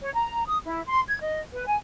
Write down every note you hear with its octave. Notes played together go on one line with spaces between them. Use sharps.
C#5
A#5
D#6
E4
C6
G#6
D#5
B4
G#5